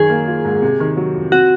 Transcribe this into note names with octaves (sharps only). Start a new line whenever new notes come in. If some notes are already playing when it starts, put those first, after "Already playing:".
Already playing: F#2 D#3 G#4
A#3
F4
G#2
C3
D#3
F#3
F2
C4 F#4